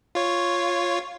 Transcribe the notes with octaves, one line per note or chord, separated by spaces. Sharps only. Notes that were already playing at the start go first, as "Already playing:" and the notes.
F4 C#5